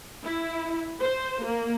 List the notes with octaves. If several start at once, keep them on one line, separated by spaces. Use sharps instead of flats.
E4
C5
A#3